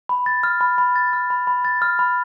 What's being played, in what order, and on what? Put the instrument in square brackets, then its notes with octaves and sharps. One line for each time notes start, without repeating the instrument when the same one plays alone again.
[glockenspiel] B5
A6
F6
B5
B5
A6
F6
B5
B5
A6
F6
B5